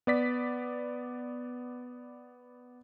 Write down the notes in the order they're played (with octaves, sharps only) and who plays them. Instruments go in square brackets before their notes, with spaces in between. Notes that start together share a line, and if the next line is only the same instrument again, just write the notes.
[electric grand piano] B3 D5 B6